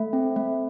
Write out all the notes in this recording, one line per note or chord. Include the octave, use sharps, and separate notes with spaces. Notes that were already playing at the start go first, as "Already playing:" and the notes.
Already playing: A3
C4
A3